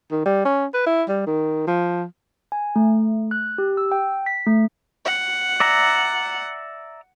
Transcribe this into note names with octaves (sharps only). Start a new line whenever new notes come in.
D#3
G3
C#4
B4
E4
G3
D#3
F3
G#5
A3
F#6
G4
E6
G5
B6
A3
F#5
D5 E5 A#5